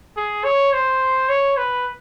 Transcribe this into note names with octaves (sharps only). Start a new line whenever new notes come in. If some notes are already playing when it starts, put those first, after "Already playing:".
G#4
C#5
C5
C#5
B4